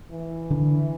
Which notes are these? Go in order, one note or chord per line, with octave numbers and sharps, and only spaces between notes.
E3
D3 D4